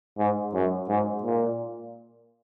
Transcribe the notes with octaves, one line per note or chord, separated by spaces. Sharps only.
G#2
F#2
G#2
A#2